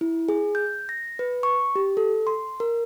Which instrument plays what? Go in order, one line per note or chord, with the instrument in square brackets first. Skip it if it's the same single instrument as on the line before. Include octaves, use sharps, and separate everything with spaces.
[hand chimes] E4
G#4
G6
A#6
B4
C#6
G4
A4
C6
A#4